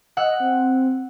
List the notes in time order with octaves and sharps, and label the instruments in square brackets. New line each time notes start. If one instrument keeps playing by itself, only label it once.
[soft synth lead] D#5 [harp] F#5 E6
[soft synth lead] C4